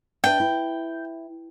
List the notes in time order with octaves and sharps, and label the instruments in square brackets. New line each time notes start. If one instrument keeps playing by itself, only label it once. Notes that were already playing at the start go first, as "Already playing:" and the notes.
[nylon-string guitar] D4 B4 E5 [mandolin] G5
[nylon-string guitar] E4